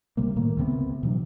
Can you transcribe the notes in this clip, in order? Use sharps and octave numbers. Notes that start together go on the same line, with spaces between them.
C#2 C3 G3 A#3
A2 D#3 A3 A#3
C#2 C3 B3
B2 E3 F#3 D4